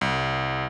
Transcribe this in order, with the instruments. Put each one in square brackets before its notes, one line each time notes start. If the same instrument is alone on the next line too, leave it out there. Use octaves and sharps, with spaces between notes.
[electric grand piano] C2